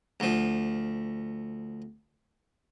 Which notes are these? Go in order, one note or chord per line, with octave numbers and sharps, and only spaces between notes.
D2 F3